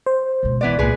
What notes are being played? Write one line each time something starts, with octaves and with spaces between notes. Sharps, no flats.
C5
C#2 B2
E3 B3 D5
C2 A#2 G#3 G#4 B4